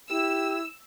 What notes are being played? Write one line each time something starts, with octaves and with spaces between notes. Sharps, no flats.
E4 G4 E6